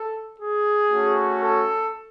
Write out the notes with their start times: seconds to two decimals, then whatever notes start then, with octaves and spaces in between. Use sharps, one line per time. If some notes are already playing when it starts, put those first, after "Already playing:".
Already playing: A4
0.40 G#4
0.91 A3 C#4 F#4
1.42 A4